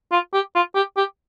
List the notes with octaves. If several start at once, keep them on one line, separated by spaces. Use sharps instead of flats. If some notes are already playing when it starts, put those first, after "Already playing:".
F4
G4
F4
G4
G4